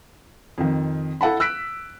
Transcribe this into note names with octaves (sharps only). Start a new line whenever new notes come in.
F2 D#3
E4 A4 F#5 A5 B5
E6 F#6 B6 D7